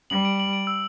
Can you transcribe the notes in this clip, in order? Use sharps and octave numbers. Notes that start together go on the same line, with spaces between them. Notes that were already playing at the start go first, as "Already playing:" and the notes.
G3 F#7
D7
F#7
D7
E6